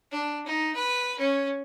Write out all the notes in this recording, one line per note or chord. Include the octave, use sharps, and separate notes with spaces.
D4
D#4
B4
C#4